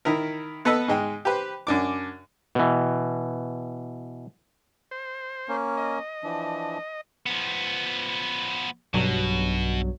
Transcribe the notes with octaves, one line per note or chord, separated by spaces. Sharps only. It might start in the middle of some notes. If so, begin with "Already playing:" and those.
D#3 E4 A#4
B3 A4 B4 D#5 B5 E6
G#2 G#3 G5
G4 B4 C5
F#2 D4 D6
B2 E3
C5
A#3 C#4
D#5
E3 F3 D4
F3 B3
B1 G2 B2 F#3